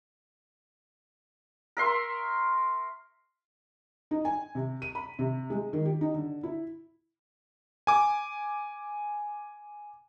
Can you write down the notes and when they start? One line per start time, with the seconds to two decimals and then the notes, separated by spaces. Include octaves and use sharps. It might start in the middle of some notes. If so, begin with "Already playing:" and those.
1.77 A#4 E5 C6 C#6
4.11 D#4
4.25 G#5
4.55 C3
4.82 D#7
4.95 B5
5.19 C3
5.50 G#3
5.73 D#3
5.86 G4
6.01 D#4
6.14 D3
6.43 E4
7.87 G#5 D6